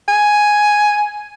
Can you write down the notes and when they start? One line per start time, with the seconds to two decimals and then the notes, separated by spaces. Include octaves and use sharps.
0.09 G#5